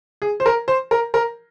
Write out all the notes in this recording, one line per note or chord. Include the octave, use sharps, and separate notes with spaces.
G#4
C5
A#4
C5
A#4
A#4